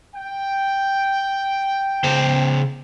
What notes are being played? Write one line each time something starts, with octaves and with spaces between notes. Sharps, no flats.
G5
C#3 C5